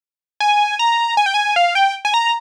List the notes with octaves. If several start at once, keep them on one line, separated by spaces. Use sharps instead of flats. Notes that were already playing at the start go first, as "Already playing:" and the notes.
G#5
A#5
G#5
G5
G#5
F5
G5
G#5
A#5